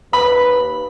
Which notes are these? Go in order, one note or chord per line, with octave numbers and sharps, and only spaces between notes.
D#2 B4 B5